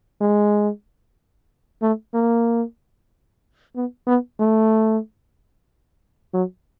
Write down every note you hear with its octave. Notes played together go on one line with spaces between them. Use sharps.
G#3
A3
A#3
B3
B3
A3
F#3